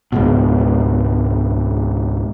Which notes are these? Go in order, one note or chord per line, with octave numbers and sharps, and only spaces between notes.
C#2 G#2 B2